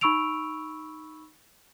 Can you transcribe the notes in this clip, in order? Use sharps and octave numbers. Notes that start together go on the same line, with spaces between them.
D#4 B5 C#6 E6 D7 F7